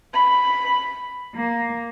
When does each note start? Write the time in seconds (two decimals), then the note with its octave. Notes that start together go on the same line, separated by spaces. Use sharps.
0.13 B5
1.34 A#3